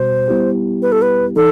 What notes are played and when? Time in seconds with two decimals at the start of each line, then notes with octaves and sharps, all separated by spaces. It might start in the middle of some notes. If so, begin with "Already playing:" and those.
Already playing: B2 G3 B3 F#4 C5
0.28 G3 B3 E4 G4
0.82 B4
0.92 A4
1.02 B4
1.36 E3 D#4 A4